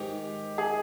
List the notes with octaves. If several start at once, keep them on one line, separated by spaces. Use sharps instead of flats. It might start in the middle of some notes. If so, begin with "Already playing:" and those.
Already playing: G#2 D#3 G#3 G4
G#4